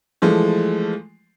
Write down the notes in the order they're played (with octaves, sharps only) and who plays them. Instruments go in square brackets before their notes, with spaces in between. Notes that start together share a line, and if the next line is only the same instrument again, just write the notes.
[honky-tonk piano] E3 F3 G#3 A3